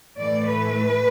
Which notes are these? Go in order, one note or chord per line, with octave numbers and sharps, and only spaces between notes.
A2 E3 A3 D5
B4